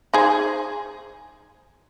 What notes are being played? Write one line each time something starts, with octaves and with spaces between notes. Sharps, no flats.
D#4 G#4 C5